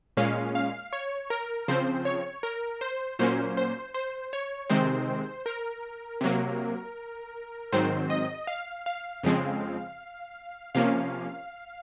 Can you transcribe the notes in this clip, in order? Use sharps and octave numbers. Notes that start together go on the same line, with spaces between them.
A#2 G#3 C#4 F5
F5
C#5
A#4
C#3 F3 C4 C5
C#5
A#4
C5
A#2 F#3 A#3 C#4 C5
C5
C5
C#5
C3 D#3 G#3 C4 C5
A#4
C3 F#3 A#3
G#2 D#3 F#3 C4 C5
D#5
F5
F5
F2 C#3 F3 G#3 C4
C3 F3 A#3 C#4 F5